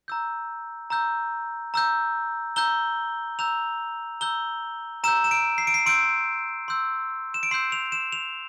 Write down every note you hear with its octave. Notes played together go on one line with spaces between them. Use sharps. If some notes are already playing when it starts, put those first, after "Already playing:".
A#5 E6 G6
A#5 E6 G6
A#5 E6 G6
A#5 E6 G6 G7
A#5 E6 G6 F7
A#5 E6 G6 G7
A#5 E6 G6 E7
E7
D7
C7
D7
C7
C6 E6 G6 D7
C6 E6 G6
E7
D7
C6 E6 G6 C7
F7
E7
F7